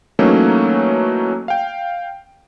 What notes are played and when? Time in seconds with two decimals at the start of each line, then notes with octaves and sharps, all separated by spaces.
0.19 E3 F#3 A3 A#3 C#4 D#4
1.48 F5 G5